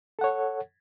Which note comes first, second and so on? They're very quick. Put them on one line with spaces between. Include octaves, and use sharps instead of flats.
A4 F#5 C#5